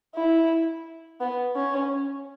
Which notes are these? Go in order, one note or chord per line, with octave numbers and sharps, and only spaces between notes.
E4
B3
C#4